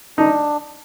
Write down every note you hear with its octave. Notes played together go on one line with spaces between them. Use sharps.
D4 D#4